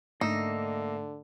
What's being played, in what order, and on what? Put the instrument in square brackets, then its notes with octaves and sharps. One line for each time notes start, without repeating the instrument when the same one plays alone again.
[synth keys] G#2 A3 D4 [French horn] D3 [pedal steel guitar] A#3 E5 A#5 [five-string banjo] D#4